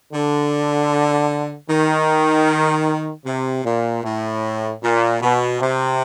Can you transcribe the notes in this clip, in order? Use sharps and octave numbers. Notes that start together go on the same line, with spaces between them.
D3
D#3
C3
A#2
A2
A#2
B2
C3